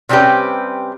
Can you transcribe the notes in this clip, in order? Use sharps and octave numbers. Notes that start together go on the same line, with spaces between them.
C3 G3 C4 C#4 G4 B4